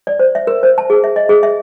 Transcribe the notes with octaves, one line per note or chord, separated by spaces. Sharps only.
D5
C5
E5
A#4
C5
A5
G#4
E5
D#5
G#4
E5